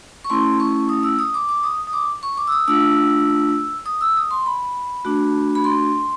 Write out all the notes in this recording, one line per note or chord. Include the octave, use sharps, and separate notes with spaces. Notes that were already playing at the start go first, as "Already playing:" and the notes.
C#6
A3 C#4 E4 C6
C#6
D#6
E6
D#6
D6
D6
D#6
D#6
D6
C#6
D6
E6
D#6
A3 D4 F4 E6
D#6
E6
D#6
C6
B5
A3 D4 F#4
B5
C6